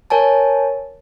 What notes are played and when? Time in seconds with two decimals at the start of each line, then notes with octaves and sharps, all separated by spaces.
0.10 A#4 C#5 G#5 A5